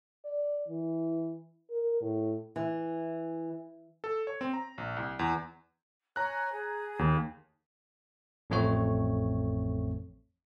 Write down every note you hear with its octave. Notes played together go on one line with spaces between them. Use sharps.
D5
E3
A#4
A2
E3
A4
C#5
C4
A#5
A#1
C2
E2
C#5 G#5 A#5 F#6
G#4
D#2
A1 F2 A3 C4 C#5